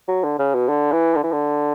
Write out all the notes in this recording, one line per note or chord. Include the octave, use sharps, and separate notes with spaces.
F#3
D3
C#3
B2
D3
E3
D3
E3
D3